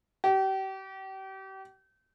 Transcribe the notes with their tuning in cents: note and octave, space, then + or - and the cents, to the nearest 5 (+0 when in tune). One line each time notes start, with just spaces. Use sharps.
G4 -35